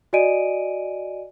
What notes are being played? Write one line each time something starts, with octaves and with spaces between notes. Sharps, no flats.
F#4 D5 D#5 G#5 D7 D#7